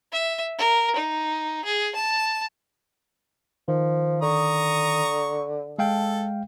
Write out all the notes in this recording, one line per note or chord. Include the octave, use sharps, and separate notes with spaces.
E5
A#4
D#4
G#4
A5
D#3 F3
D3 A#5 C#6 D#6
G#3 A4 F5 G5